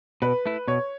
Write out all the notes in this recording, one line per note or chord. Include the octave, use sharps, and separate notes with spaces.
B2 B4
A3 E4
B2 C#5